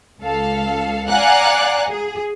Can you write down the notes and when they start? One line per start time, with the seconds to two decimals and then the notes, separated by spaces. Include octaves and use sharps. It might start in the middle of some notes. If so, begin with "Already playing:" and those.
0.20 C#2 A4 F5
1.09 D5 F5 F#5 G#5 A#5 F#6
1.90 G#4